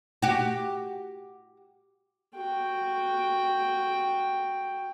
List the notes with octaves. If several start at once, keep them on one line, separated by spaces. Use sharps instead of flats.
F#4 G4
F#4 G5